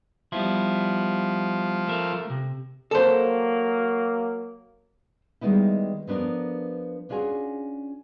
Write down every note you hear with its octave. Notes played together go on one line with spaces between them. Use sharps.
F3 G3 B3 E4
A3 A4 A#4
C3
F#3 A#3 A4 C5
D#3 G3 G#3 B3 D#4 E4
F3 B3 D4 A4 A#4
C#4 D4 F4 F#4 G#4